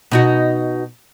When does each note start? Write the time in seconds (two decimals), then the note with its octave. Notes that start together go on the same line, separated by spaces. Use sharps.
0.12 B2 D#4 F#4